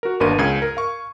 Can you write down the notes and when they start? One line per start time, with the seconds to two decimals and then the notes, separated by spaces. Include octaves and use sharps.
0.03 F#4 A#4
0.20 G1 D#2 D4 A#4 B4 D#7
0.38 C#2 C#3 G#6
0.62 A#4
0.77 F5 C#6